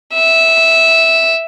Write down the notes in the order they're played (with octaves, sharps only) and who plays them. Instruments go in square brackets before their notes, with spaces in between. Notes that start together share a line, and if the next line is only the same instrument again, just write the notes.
[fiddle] E5